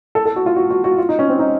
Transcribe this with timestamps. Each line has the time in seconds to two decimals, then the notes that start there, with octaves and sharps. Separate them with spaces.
0.15 A4
0.25 A4
0.36 F#4
0.46 F4
0.56 F#4
0.71 F#4
0.84 F#4
0.98 F4
1.09 D#4
1.19 C#4
1.29 C4
1.39 D#4